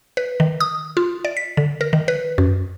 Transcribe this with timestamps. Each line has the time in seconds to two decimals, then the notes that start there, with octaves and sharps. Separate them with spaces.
0.17 B4
0.40 D#3
0.60 D#6
0.97 F4
1.25 D5
1.37 B6
1.57 D3
1.81 A#4
1.93 D#3
2.08 B4
2.38 F#2